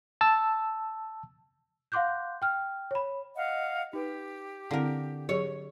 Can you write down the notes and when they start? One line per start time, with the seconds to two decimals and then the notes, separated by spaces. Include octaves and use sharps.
0.21 A5 E6
1.92 F5 F#5 C6 D6 F#6 G6
2.42 G5 F6
2.91 C#5 B5
3.35 D#5 F5 F#5
3.93 D#4 G4 B4
4.71 D3 C4 E4 A#4 F5
5.29 F#3 G4 G#4 C#5